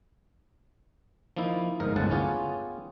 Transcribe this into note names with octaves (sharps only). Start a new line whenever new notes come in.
F3 A#3 D#4 E4
G1 G#2 A#4 D#5
G1 D2 A2 G#3 F#5 A5
B3 C#4 F4 G4 G#4